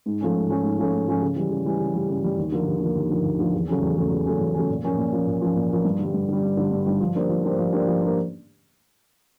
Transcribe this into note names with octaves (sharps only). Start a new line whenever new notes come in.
G#2
F3 A3 C#4
G#2
F3 A3 C#4
G#2
F3 A3 C#4
G#2
F3 A3 C#4
C#3
E3 G3
C#3
E3 G3
C#3
E3 G3
C#3
E3 G3
D#2
D3 F3 A#3
D#2
D3 F3 A#3
D#2
D3 F3 A#3
D#2
D3 F3 A#3
E2
C#3 F#3 A3 C#4
E2
C#3 F#3 A3 C#4
E2
C#3 F#3 A3 C#4
E2
C#3 F#3 A3 C#4
A#2
F3 A#3 C#4
A#2
F3 A#3 C#4
A#2
F3 A#3 C#4
A#2
F3 A#3 C#4
G2
D3 G3
G2
D3 G3
G2
D3 G3
G2
D3 G3
F3
A#3 D4 G4 C5
F3
A#3 D4 G4 C5
F3
A#3 D4 G4 C5
F3
A#3 D4 G4 C5